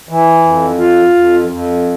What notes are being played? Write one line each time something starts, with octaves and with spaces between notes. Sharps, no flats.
E3
F2
F4
F2
F2